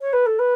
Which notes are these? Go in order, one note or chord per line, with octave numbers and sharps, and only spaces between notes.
C#5
B4
A4
B4